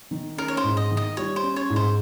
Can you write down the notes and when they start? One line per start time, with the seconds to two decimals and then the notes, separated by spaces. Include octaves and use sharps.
0.11 D#3
0.37 C#4 A#4
0.48 C#5
0.57 C5
0.64 G#2
0.77 D#5
0.91 D#3
0.97 D#5
1.17 G3 C#5
1.36 C5
1.43 C#4
1.56 C#5
1.70 G#2
1.76 C5